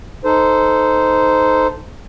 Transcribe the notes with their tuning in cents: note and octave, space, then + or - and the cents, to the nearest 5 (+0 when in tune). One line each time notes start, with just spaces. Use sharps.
D#4 +0 A4 +0 C5 -15